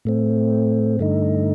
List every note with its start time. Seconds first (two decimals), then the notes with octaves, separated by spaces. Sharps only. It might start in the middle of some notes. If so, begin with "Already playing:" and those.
0.05 A2 A3 C4
0.99 G2 D3 A3 D#4